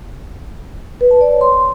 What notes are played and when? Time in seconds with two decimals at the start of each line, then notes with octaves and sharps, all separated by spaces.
1.01 B4
1.11 A5
1.21 D5
1.31 C#5
1.41 C6